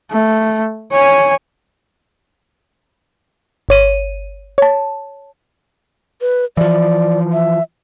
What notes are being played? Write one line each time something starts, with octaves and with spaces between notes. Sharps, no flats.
A3
C#5 G#5
G1 C#5 D#7
C#5 A5
B4
E3 F3 D5
E5